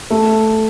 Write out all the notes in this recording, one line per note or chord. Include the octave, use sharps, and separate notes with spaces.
A3